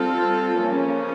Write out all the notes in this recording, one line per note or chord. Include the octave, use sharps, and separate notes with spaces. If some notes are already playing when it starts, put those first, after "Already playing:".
Already playing: G3 C4 F4 A4
C#3 F3 A#3 C#4